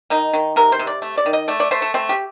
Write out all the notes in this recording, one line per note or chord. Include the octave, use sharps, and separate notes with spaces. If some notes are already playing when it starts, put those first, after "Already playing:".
D#3 D#4
D#3
C3 A#4
C5
C3
D5
A3
D5
D#3
D#5
A3 D5
D5
A3 C5
A4
A3 C4
G4